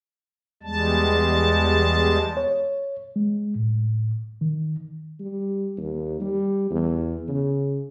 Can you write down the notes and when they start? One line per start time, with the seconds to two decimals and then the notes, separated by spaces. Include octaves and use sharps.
0.63 E2 G3 G#3 A5
2.37 C#5
3.16 G#3
3.55 A2
4.41 D#3
5.20 G3
5.77 D#2
6.20 G3
6.71 E2
7.28 C#3